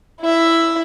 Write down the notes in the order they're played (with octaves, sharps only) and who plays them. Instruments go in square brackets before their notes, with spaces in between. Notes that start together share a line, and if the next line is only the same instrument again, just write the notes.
[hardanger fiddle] E4 E5